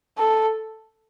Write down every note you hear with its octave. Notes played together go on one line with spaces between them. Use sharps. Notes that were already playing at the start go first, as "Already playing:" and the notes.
A4